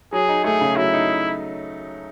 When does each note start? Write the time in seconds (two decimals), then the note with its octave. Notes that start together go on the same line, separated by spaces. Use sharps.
0.13 F#3 G#4
0.29 D#4
0.44 A3 G#4
0.61 C#3
0.76 F#3 E4
0.93 D#4